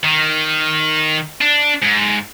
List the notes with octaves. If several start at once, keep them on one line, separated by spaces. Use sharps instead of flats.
D#3
D4
G#2